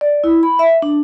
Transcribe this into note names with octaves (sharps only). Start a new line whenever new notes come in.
D5
E4
B5
E5
D4